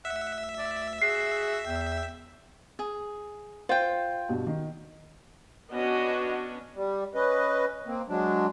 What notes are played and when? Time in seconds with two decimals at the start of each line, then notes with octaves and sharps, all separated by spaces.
0.05 D2 E5 F#5
0.58 D5
1.02 F#4 G#4 C7
1.66 E2 G5
2.79 G#4
3.69 F4 C5 G5
4.29 G2 B2
4.47 D#3
5.72 B3 C#4 D4 F#4 D#5
6.75 G3
7.15 C#4 B4 D#5
7.86 A#3 C4
8.08 F#3 G#3 D4